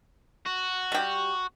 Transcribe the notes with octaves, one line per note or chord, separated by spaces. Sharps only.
F#4
G3 G4